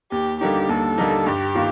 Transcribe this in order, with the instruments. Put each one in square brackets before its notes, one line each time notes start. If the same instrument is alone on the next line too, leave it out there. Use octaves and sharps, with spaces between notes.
[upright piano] D#2 [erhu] G4
[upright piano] D3 G3 A#3 D#4 [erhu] G4
[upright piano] D#2 [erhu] A4
[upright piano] D3 G3 A#3 D#4
[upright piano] G2 [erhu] G4
[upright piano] D#3 A#3 F4